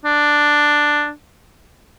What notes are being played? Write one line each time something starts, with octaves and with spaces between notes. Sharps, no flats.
D4